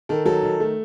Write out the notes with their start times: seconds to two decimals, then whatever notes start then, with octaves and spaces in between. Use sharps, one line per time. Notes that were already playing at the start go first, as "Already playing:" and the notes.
0.09 D#3 A4
0.25 F#3 A4
0.43 D#3
0.60 A3